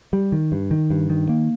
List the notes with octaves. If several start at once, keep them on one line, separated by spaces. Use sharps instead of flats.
G3
D#3
G2
D#3
G2
D#3
A#3